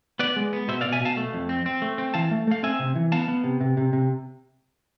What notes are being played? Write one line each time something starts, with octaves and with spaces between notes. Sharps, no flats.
B3 B4 D5
G#3
B3
B2 C5 E5
D5 F5
B2
E5 G#5
B2 F5 A5
A3
F2
C4
C4
A3
C4
E3 F5 A5
A3
A3 F5
C4 E5 G#5
C3
E3
B3 F5 A5
B3
C3
C3
C3
C3